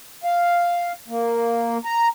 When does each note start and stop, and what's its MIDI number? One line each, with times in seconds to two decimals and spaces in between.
0.24 0.92 77
1.08 1.78 58
1.85 2.08 82